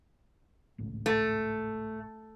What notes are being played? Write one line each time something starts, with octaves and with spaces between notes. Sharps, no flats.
G#1 C#2 A2
A3